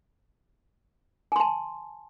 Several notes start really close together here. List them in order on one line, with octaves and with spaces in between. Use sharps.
G#5 C6 A5